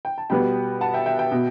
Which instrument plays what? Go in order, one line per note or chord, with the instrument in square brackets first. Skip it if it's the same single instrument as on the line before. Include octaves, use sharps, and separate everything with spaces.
[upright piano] G5
A5
B2 G3 B3 G5 B5
F#5 A5
E5 G5
E5 G5
E5 G5
B2